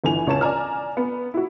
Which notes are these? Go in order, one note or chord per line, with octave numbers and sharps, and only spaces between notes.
G1 E3 G#5 F7
C#2 C#5 A5 E7
D5 G#5 A#5 F6
B3
E4 F#4